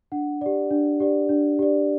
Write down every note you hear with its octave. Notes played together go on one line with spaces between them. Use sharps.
D4 F#5
G4 D5
D4
G4 D5
D4
G4 D5